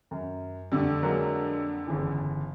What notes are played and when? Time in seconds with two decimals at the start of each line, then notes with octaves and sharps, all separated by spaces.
0.11 F#2
0.72 F2 D3 G3 A3
1.03 F#3 G#3 A#3
1.87 G1 C#3 E3